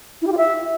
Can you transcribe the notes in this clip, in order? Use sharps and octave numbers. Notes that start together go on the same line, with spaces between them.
E4
G4
F4
E5